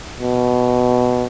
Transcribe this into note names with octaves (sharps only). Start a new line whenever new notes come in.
B2